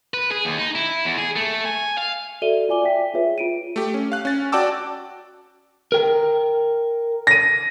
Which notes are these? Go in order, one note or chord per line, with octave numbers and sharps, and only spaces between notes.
B4
G#4
D#2
D#4
E4
E2
G#4
A3
G#5
F5
F#4 A4 D5 E5 D#7 G7
F4 D5 G#5 D6 G7
D5 E5 G5 B6
F4 G#4 B4 C#5 E5
F4 D7 D#7
A3 G4
C#4
F5 F#6
C#4 A6
F#4 D5 G5 A5 D6 E6
A#4 G5
A#6 D#7